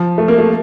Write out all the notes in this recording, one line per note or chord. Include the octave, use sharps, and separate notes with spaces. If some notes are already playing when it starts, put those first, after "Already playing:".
Already playing: F3
A3
A#3
A3